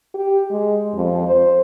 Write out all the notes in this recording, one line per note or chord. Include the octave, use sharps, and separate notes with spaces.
G4
G#3
F2
C5